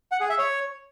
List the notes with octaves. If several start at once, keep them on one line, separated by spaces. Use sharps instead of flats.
F#5
G#4
E5
C#5